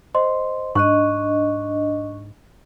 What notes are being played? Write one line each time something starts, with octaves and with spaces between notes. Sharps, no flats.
C5 D#5 C6
G#2 D4 D#5 C#6 F#6